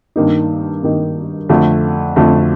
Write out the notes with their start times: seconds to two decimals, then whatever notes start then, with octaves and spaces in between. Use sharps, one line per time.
0.16 G2 D#3 A#3 D#4
0.83 G2 D#3 A#3 D#4
1.49 F2 D3 A3
2.16 F2 D3 A3